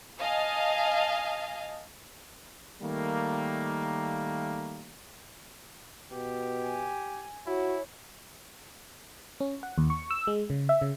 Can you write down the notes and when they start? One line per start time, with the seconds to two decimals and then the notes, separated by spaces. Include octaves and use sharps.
0.20 D#5 F5 G#5 A5
2.81 D#3 G3 A3 A#3
6.12 B2 G4
6.64 G#5
7.47 E4 F#4 C#5
9.40 C#4
9.63 F#5
9.78 D#2
9.90 C#6
10.10 E6
10.27 G#3
10.50 C#3
10.69 E5
10.82 C#3